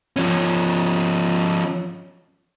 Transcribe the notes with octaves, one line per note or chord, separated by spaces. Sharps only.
F3 C#4